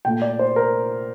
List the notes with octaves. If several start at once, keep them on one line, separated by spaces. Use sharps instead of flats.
A#2 A3 G5
D5
C5
A#4